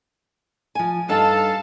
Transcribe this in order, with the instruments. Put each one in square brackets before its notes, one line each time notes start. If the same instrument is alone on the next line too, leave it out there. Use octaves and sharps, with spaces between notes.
[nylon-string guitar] F3 G#5
[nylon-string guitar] G2 D#4 [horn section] A4 F5 [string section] A5